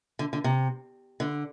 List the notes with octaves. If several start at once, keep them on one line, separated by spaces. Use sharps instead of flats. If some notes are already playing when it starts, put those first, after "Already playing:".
D3
D3
C3
D3